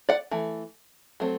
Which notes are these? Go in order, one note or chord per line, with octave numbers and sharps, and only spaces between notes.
D5 F#5
E3 A3
F#3 A3 C4